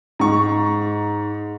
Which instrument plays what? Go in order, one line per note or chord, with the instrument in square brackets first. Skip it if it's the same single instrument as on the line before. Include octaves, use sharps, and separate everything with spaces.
[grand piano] G#2 C#6